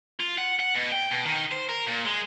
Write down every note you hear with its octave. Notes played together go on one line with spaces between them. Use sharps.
F4
F#5
F#5
B2
G5
B2
D#3
C5
A#4
A#2
G#3